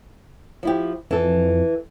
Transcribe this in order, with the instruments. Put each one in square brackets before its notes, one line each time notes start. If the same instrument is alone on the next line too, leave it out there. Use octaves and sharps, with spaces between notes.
[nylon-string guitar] F3 E4 G4
[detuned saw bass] F2 [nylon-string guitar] E3 A4